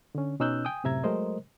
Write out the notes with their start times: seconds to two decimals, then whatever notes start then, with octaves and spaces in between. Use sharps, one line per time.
0.15 D3 C#4
0.40 B2 C#4 D#4 E6 F#6 G6
0.65 G5 G#5 D#6
0.84 F#2 A2 C3 E5 A#5 G#6
1.03 F#3 G#3 A3 A#4 C5 D#5